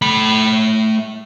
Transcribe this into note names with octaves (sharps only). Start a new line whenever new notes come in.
A3 B5